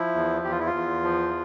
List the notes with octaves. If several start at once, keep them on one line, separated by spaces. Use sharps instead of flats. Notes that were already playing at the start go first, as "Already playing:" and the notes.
Already playing: F3 E4
E2
E2 G4
F4
E4
F4
E2
F3